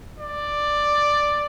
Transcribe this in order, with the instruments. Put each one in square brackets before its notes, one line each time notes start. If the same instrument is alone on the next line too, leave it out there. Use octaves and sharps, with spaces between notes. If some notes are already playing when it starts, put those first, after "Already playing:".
[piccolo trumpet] D5